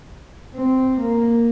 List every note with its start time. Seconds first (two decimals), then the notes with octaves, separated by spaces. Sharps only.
0.55 C4
1.01 A#3